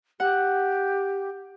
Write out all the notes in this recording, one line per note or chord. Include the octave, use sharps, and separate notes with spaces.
G4 F#5